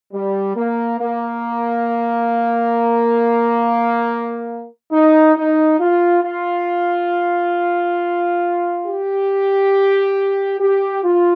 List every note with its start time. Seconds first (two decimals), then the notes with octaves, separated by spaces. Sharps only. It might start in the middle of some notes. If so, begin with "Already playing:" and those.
0.13 G3
0.56 A#3
1.00 A#3
4.92 D#4
5.36 D#4
5.80 F4
6.23 F4
8.86 G4
10.60 G4
11.04 F4